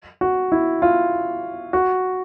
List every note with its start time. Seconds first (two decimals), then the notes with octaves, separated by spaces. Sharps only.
0.21 F#4
0.52 E4
0.82 F4
1.73 F#4